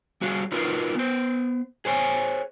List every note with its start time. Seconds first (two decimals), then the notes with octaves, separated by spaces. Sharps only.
0.21 G3 F#4 G#4 F5
0.52 D#4 F4 F#4 A#4 B4
0.95 B3 C5
1.85 G#4 C5 C#5 G#5